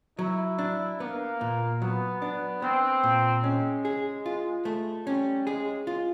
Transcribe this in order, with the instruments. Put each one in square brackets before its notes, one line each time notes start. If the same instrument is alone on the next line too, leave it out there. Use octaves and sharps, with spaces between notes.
[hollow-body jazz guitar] F#3 [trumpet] E4
[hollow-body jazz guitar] D4
[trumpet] A#3 [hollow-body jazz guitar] B3
[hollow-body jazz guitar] A#2
[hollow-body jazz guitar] F#3 [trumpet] B3
[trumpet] B3 [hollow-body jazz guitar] D4
[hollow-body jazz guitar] B3 [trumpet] C4
[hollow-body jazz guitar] A#2
[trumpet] G#3 [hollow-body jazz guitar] C#4
[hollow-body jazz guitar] G#4
F4
A3
[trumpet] G3 [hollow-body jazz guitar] C#4
[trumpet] G#3 [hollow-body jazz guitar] G#4
[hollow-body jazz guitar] F4